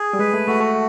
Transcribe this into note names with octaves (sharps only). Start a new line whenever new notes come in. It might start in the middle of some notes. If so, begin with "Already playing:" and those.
Already playing: G#4
G3
G#3 B4
A3
A3 F#4
A3